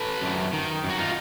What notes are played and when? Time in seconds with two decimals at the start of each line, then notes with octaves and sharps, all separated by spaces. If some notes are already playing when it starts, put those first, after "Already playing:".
Already playing: A4 B4
0.22 F#2
0.53 D#3
0.84 F#2
0.90 F#4
0.99 D#4 F4